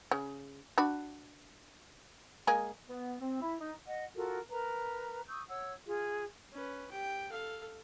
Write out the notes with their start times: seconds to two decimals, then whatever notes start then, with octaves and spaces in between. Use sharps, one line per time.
0.11 C#3
0.78 D4 F#4 B5
2.47 G#3 A#3 G#4
2.89 B3
3.21 C4
3.41 E4
3.60 D#4
3.85 D#5 F#5
4.15 F4 F#4 A4 A#4
4.50 A#4 B4 A#5
5.29 C#6 D#6 E6 G6
5.48 C#5 F#5 E6
5.87 F4 G#4
6.52 C#4 B4
6.91 G4 G5
7.30 A4 F5